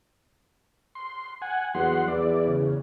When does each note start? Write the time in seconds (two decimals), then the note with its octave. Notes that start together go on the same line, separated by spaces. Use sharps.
0.95 C6
1.42 F#5 G#5
1.75 E2 F#3 F#5 C6
2.08 E2 E4 D5
2.47 C#3